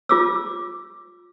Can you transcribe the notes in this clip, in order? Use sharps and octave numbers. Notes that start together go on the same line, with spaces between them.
F4 D6 E6